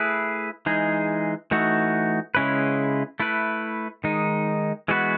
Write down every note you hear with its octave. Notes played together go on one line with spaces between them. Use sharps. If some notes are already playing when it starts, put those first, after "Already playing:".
Already playing: A3 E4 G#4 B4
E3 G#3 D#4 G#4
E3 A3 D#4 F#4
C#3 G#3 C#4 E4 B4
A3 E4 B4
D#3 G#3 D#4
E3 G#3 B3 F#4 B4